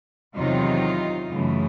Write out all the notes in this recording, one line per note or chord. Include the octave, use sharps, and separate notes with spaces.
E2 C3 D#3 F#3 D#4 F4
F#2 C#3 E3 A3